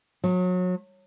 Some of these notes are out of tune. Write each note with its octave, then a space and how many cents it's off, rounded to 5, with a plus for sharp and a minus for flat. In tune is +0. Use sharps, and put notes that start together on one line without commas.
F#3 -30